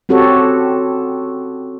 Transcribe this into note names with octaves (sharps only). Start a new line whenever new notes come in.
C4 C#4 F#4 G4 A4 C#5